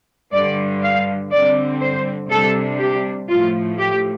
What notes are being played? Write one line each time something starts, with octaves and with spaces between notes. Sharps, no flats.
G2 D3 G3 D5
F5
D3 G3 C4 D5
C5
C3 G3 D4 A4
G4
A2 F3 A3 F4
G4